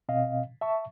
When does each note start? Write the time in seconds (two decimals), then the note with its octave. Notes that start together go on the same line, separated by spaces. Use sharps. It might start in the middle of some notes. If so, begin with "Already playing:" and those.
0.09 B2 C4 D#5 F5
0.61 E5 A5 C#6